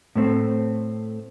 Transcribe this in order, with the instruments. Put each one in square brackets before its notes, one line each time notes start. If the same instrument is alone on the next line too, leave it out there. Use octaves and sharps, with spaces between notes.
[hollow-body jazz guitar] A2 A3 C4